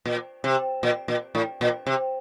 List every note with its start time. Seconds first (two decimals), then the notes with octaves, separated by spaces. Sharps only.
0.05 A#2
0.44 C3
0.83 A#2
1.08 A#2
1.35 A2
1.61 A#2
1.86 C3